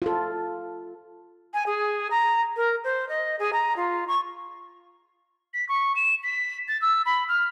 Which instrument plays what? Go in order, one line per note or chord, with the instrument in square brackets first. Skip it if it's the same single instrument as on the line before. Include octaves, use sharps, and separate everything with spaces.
[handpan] F4 A4
[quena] G#5
G#4
A#5
A#4
C5
D#5
G#4
A#5
F4
C#6
[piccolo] B6
C#6
E7
B6
A6
E6
B5
F6